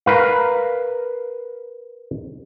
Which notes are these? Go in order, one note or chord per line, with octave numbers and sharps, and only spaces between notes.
A#4 B4 F5